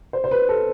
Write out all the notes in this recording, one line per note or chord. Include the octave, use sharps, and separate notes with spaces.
C5
C5
B4
A4